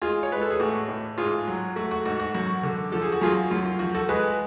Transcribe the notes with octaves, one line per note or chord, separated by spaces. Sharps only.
G#3 F4 G#4
C#5
G#3 B4
A4
G#4
A2 F#4
A2
G#2 F4 G#4
F#3
A3 F#4
F#4
G#2 F#4
F#4
F#2 F#4
D3
F3 A4
G#4
F#4
F#2 F4 G#4
F#2 F4
F4
F3 F#4
F#4 A4
G#3 G#4 B4